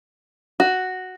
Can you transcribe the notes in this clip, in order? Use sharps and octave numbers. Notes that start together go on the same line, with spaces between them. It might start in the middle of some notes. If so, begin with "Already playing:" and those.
F#4